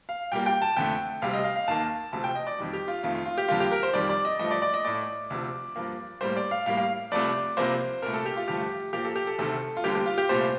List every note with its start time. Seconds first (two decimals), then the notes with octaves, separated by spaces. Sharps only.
0.09 F5
0.32 A#2 G3 A#3 G5
0.46 G5
0.62 A5
0.77 F2 D3 A3 G5
1.22 D2 C3 G3 F5
1.33 D#5
1.44 F5
1.56 F5
1.68 D#2 D#3 A#3 A5
2.13 D2 C3 F3 A3 A5
2.24 G5
2.35 D#5
2.47 D5
2.58 F2 D#3 G3
2.73 G4
2.88 F4
3.03 F2 D#3 A3 F4
3.15 F4
3.26 F4
3.38 G4
3.48 F2 D3 G3 A#3 F4
3.60 G4
3.71 A#4
3.83 C5
3.94 F2 D#3 G3 D5
4.09 D5
4.25 D#5
4.39 G2 F3 A3 D#5
4.51 D5
4.62 D5
4.74 D#5
4.85 A2 A3 D5
5.30 D2 C3 F3
5.76 G2 F3 A#3
6.21 A2 G3 A#3 C5
6.36 D5
6.51 F5
6.66 A2 G3 A#3 F5
6.77 F5
7.12 C2 C3 F3 A3 D5
7.57 C2 C3 F3 A#3 C5
8.02 C2 A#2 A3 A#4
8.14 A4
8.25 G4
8.37 F4
8.48 G2 D3 F3 A3 G4
8.93 A#2 F3 A#3 G4
9.05 A4
9.16 G4
9.27 A4
9.38 D2 C3 D#3 A3 A4
9.77 F4
9.84 D2 D3 G3 A#3 G4
9.95 G4
10.06 F4
10.18 G4
10.29 C2 A#2 A3 C5